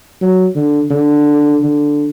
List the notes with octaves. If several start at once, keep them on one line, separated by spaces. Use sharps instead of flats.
F#3
D3
D3
D3